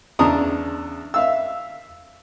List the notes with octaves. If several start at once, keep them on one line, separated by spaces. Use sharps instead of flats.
E2 C#3 D4 A5 A#5 D#6
E5 F5 E6